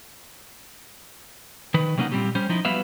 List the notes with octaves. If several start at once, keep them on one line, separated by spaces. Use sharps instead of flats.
D#3 B4
C3 F#3 A#3 C#4 D#4 F#5
A#2 G3 C4 G4
G3 C#4 C5
F3 D#4 E4
F#3 G3 B3 B4 E5 F5